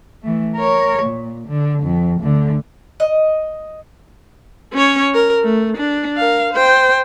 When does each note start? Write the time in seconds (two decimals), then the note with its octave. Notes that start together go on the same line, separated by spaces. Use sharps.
0.22 E3 A3
0.55 A#4 C#5
1.02 A#2
1.48 D3
1.83 F2
2.21 D2 D3
3.00 D#5
4.73 C#4 C#5
5.14 A#4
5.44 A3
5.77 D4
6.17 A#4 F5
6.53 C5 G5